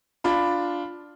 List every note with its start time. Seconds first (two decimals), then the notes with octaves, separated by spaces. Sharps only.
0.24 D4 F4 B5